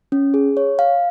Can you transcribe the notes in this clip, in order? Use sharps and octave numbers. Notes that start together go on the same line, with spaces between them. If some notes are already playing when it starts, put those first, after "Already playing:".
C#4
G#4
C#5
F5